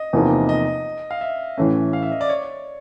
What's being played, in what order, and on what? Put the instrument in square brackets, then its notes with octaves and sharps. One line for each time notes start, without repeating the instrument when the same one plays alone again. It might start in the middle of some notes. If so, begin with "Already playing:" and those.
Already playing: [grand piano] D#5
[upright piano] E2 C3 F3 A#3 D#4
[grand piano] D#5
F5
E5
[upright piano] A2 E3 A3 C#4
[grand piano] F5
E5
D#5
D5
C#5